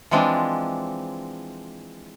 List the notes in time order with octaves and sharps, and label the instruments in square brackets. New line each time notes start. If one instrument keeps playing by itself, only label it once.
[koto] E3 F3 G#3 C4 D4